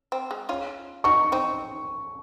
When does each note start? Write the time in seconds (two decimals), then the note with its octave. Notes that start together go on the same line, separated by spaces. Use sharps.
0.12 C4
0.31 G#3
0.49 C#4 F4
1.04 D#4 F#4 C#6
1.32 C4 D#4